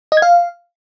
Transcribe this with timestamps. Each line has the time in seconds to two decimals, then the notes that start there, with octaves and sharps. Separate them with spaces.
0.12 D#5
0.17 G#6
0.22 F5